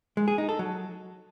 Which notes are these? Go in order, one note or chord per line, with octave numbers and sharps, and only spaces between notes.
G#3
G#4
D#4
A4
F#3